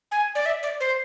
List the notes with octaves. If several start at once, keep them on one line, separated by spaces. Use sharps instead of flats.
G#5
D5
E5
D5
C5